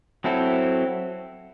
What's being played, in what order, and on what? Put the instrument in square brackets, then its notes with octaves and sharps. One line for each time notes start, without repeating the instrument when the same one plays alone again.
[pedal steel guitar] F#3 C4 E4 A4